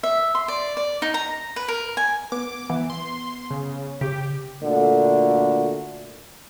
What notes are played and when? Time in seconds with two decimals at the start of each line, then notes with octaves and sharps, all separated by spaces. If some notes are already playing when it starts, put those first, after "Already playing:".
0.03 E5
0.35 C6
0.48 D5
0.77 D5
1.02 D#4
1.14 A#5
1.56 B4
1.68 A#4
1.97 G#5
2.32 B3 D6
2.69 E3 B3
2.90 C6
3.50 C#3
4.01 C#3 G4
4.63 A#2 D3 A3 A#3 F#4